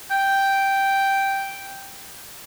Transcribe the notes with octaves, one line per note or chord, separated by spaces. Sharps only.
G5